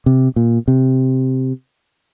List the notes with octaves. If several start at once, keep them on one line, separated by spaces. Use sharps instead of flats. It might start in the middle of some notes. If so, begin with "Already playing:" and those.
C3
A#2
C3